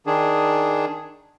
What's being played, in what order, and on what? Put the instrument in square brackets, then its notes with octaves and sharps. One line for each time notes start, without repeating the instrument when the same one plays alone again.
[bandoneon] D#3 D4 G#4